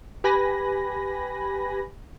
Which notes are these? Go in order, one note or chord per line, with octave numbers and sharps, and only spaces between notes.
G4 B4 G#5 B5 A#6